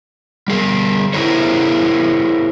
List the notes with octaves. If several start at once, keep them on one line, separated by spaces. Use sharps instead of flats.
G3 G#4 A#4
E4 G#4 A#4 C5 C#5